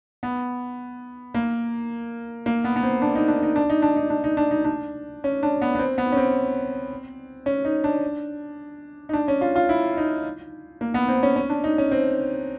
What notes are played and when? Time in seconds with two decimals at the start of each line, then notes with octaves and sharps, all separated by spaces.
0.23 B3
1.34 A#3
2.46 A#3
2.64 B3
2.76 B3
2.83 C4
3.02 D4
3.15 D#4
3.28 D4
3.43 D#4
3.56 D4
3.70 D#4
3.82 D4
3.96 D#4
4.10 D4
4.24 D#4
4.37 D4
4.51 D#4
4.65 D4
5.24 C#4
5.43 D4
5.61 B3
5.75 B3
5.79 C4
5.98 B3
6.12 C#4
6.17 C4
7.46 C#4
7.65 D#4
7.84 D4
9.09 D#4
9.13 D4
9.28 C#4
9.41 F4
9.56 F4
9.69 E4
9.97 D#4
10.81 A#3
10.94 B3
11.08 C4
11.23 C#4
11.36 C#4
11.50 D4
11.64 D#4
11.78 C#4
11.92 C4